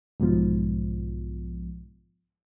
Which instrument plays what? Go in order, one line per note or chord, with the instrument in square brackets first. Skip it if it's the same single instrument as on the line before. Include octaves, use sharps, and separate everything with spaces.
[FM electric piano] B1 G#2 B2 F3